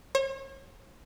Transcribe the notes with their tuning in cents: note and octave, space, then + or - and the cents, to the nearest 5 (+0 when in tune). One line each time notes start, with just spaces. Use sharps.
C#5 -40